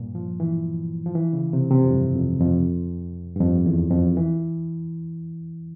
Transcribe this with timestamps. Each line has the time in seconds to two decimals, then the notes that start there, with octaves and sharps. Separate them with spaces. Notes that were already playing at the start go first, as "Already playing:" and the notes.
Already playing: G2 A#2
0.15 F3
0.40 E3
1.06 F3
1.15 E3
1.33 C#3
1.53 C3
1.71 C3
1.85 F2
1.91 G2
2.16 F2
2.41 F2
3.36 G2
3.41 F2
3.66 E2
3.91 F2
4.17 E3